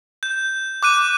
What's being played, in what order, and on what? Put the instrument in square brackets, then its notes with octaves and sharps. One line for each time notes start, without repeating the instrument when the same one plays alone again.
[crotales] G6
D6 F#6 D#7